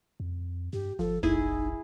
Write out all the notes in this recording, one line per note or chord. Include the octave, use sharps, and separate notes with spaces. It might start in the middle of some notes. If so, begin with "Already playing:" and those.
F2
G2 G4
G1 F3 A4
F1 A#1 D#4 E4 G#4